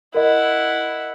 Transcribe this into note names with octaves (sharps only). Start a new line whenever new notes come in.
E4 A#4 D#5 F#5